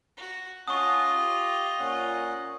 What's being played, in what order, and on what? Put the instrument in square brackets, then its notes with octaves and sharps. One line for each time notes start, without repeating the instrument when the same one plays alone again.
[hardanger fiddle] F#4
[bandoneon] C#4 F#5 A5 [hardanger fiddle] F4 D#5 [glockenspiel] C#6 D#6
[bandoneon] G4
A#2 C#4 F#5